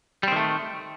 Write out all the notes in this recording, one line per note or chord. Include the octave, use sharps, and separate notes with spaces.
D#3 G3 A3 C4